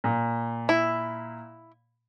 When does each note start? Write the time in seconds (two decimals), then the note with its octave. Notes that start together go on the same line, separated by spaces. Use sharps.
0.04 A#2
0.69 E4